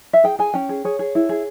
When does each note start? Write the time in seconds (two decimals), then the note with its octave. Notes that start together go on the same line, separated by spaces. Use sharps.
0.13 E5
0.24 G#4 G5
0.39 G#4 G#5
0.54 C#4 G5
0.69 G#4
0.85 G#4 C#5
0.99 G#4
1.15 E4
1.29 G#4